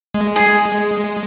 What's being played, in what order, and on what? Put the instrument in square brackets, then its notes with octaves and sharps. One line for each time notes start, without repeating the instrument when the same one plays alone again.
[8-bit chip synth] G#3
[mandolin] G#4